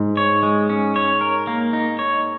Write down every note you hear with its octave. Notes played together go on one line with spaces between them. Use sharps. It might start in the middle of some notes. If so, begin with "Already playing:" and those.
Already playing: G#2
C#5
G#3
C#4
C#5
A#4
A#3
D#4
C#5